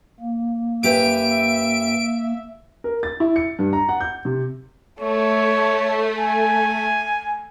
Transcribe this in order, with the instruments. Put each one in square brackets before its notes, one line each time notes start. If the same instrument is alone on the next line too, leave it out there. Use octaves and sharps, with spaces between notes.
[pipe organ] A#3
[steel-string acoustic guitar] F#2 G4 B4 [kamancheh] E5 [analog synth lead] D7
[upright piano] A#4
A6
E4
C#7
G2
A#5
F#5
G6
C3
[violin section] A3 [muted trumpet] C#5
[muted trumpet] G#5